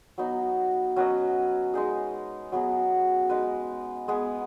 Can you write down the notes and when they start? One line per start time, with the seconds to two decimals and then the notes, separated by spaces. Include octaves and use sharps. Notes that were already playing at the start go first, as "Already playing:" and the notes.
0.18 F#3 B3 D#4
0.96 F#3 C#4 B4 D#5
1.74 G#3 D#4 G#4
2.52 F#3 B3 G#4
3.30 G#3 D#4 B4
4.08 G#3 B3 G#4 B4